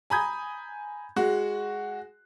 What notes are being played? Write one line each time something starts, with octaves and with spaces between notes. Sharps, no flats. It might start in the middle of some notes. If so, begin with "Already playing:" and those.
G#5 A#5 B5 D#6 G6 G#6
G#3 F#4